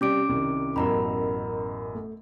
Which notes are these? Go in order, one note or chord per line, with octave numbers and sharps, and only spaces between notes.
C3 G3 C#4 D6 D7
C2 D#3
A1 F#2 B2 A#4 A#5 B5
A3